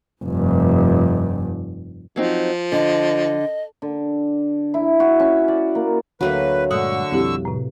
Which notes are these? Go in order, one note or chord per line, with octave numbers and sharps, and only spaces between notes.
F1 G2
F3 F#3 C4 D#4
D3 D#5
D3
E4
F#4
C#4
D5
A#3
D2 D3 F#3 A3 A#3 B4
G2 A#2 D3 G#3 F#5 C#6 D#6 E6
B1 F2 G3 C4 E4 G4
A2 C3